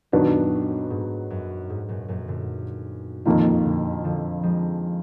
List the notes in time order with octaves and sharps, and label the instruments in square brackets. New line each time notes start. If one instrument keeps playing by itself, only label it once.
[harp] F#2 A#2 [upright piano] D#3 F#3 B3 D4
[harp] G#2
F#2
G#2
F#2 A#2
F#2 A#2
A#2 D3
[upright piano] F2 D#3 A#3 F4 [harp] A#2 D3
[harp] A#2 D3
D3 F3
F3 G#3